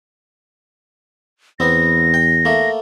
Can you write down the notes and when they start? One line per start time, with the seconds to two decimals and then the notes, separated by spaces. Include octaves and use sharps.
1.60 E2 B3 C4 A#6
2.14 G5
2.45 A3 A#3